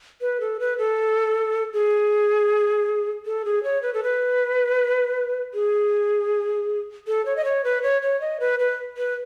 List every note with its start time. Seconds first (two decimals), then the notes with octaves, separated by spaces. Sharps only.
0.21 B4
0.40 A4
0.60 B4
0.78 A4
1.73 G#4
3.26 A4
3.45 G#4
3.64 C#5
3.82 B4
3.94 A4
4.03 B4
5.54 G#4
7.07 A4
7.26 C#5
7.36 D#5
7.45 C#5
7.64 B4
7.83 C#5
8.02 C#5
8.21 D#5
8.40 B4
8.59 B4
8.97 B4